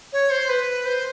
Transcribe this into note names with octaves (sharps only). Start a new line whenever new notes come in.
C#5
C5
B4
C5